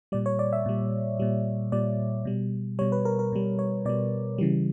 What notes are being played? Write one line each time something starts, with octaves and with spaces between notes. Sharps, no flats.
A#2 G3 D5
C#5
D5
E5
A#2 G3
A#2 G3
A#2 G3 D5
B2 G3
B2 G3 C#5
B4
A#4
A#4
B2 G3
C#5
B2 G3 D5
C#3 E3 G3